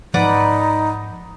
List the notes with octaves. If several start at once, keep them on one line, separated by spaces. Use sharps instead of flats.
G#2 F3 D#4 B4 D5 F#5